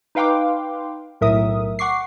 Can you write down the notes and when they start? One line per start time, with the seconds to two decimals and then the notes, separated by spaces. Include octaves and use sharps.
0.15 D#4 B4 F5 G5 C6 D6
1.21 B1 A2 A#4 E5 D#6
1.79 F#5 C#6 D6 C7